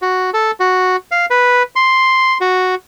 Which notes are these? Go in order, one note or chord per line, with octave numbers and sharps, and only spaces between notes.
F#4
A4
F#4
F5
B4
C6
F#4